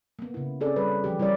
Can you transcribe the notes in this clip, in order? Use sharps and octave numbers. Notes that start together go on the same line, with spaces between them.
A#3 B3
C#3 E4
C4 C#4 G#4 A4 D5
G3 B4
E3 F3 G4
G3 E4 A#4 C#5 D5